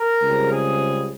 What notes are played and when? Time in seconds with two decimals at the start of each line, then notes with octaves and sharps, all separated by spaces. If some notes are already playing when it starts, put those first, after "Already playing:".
Already playing: A#4
0.22 C#2 C#3 G3 C4
0.50 G#4